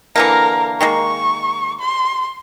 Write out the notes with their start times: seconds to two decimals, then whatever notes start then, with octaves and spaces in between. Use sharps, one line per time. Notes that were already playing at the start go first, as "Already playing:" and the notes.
0.16 D3 E3 A#3 A#4
0.81 D#3 G#3 A#3 C#6
1.80 C6